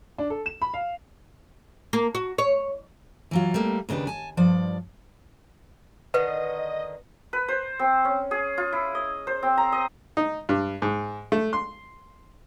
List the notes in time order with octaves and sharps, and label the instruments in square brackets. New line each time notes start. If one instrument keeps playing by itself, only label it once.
[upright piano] D4
A4
E7
B5
F5
[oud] A#3
F#4
C#5
[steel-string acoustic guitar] E3 F#3 F4
G3 A3 A#3
D#2 C#3 D4 G4 B4
G#5 A5
G2 F3 D5
[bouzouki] D3 D#3 [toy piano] B4 [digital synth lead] D#5
[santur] B4
C5
C4
C#4
G#4
F4
E4
D#5
C5
C4
A#5
D#5
[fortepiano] D#4
G2
G#2
A3
C6